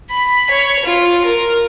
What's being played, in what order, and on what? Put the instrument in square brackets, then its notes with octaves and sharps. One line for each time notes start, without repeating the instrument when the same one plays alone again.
[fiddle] B5
C#5
F4
A#4